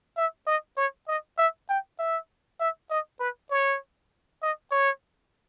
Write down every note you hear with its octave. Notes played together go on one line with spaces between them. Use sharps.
E5
D#5
C#5
D#5
E5
G5
E5
E5
D#5
B4
C#5
D#5
C#5